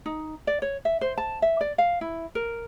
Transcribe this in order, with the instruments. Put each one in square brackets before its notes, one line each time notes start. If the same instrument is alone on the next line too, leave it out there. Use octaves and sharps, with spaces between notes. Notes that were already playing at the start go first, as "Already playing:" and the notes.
[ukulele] D#4
D5
C#5
E5
C5
A5
E5
D5
F5
E4
A#4